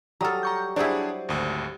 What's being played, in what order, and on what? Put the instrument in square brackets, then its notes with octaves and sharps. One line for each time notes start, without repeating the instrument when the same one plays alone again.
[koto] F#3 A4 [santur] G3 [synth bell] A#5 D#6 F6
[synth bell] A#5 C#6 G6
[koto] F#3 E4 [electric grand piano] D4 G#4 [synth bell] G4 C5 D5
[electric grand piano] G#1 D2